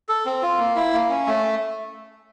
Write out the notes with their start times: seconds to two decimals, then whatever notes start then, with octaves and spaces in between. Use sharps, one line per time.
0.09 A4
0.26 C4
0.42 F4
0.58 A#3
0.76 E4
0.93 A#3
1.09 C#4
1.27 A3